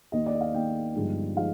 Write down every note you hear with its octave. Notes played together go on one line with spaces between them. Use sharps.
D#2 D#3 A#3 D#5
D5
D#5
F5
D#2 D#3 A#3 G5
G1 G2 F3 G#3 D#4
F3 G#3 D#4 F5